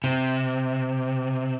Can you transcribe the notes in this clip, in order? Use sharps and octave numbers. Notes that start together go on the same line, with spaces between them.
C3